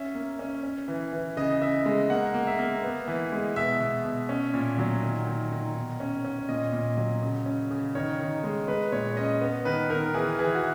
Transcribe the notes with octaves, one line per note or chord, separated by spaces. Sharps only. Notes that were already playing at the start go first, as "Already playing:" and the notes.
Already playing: C#4 E5
A#3
C#4
C#4
E3
E3
C#3 D#5
C#3 E5
G#3
A#3 F#5
A#3
E5
A#3
B3
E3
G#3
B2 E5
B2
B2
C#4
A#2
F#3
D#3
D#3
D#3
B2
C#4
C#4
A#2 D#5
A#2
F#3
C#3
C#4
C#3
D#3 C#5
D#3
G#3
G#3 B4
A#2 C#5
C#4 D#5
B3
D#3 B4
D#3 A#4
E3 G#4
E3 G#4
F#4